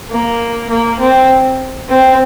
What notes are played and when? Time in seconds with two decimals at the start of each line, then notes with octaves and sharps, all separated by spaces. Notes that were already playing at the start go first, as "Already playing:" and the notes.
0.10 A#3
0.70 A#3
0.99 C4
1.88 C4